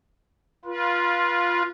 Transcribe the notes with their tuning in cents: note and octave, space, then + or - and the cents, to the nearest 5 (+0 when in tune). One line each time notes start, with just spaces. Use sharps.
F4 +0 B4 -35